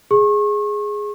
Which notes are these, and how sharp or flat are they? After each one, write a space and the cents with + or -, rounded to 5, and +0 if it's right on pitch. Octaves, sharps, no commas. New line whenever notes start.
G#4 +0 C#6 -35